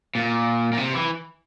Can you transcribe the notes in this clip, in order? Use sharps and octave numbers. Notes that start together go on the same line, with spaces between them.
A#2
A#2
C3
E3